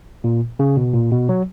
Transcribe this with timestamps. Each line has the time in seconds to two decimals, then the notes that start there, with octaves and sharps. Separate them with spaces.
0.24 A#2
0.59 C#3
0.77 B2
0.94 A#2
1.11 B2
1.29 F#3